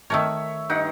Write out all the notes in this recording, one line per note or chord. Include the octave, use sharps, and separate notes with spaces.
D#3 A3 A#4 C#5 E5
G2 D#4 F#5